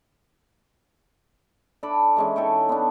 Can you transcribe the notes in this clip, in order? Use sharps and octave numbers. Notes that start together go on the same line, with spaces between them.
D4 A4 B5 D6
E3 G#3 C#4
D#4 A4 C#5 G5
B3 D4